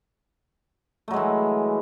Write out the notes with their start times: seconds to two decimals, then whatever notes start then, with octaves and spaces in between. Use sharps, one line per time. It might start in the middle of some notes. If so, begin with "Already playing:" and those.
1.08 A3
1.11 F#3
1.13 G#3
1.16 E3